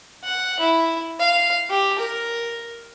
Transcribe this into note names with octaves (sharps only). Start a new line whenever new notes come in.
F#5
E4
F5
G4
A#4